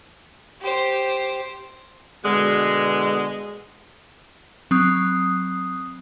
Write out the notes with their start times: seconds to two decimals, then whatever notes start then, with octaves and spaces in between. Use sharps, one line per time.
0.61 G4 C5
2.24 B2 D3 G#3
4.71 F#3 C4 D#6